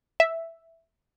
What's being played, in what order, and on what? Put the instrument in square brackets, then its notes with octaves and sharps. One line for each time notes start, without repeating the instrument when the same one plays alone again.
[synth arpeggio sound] E5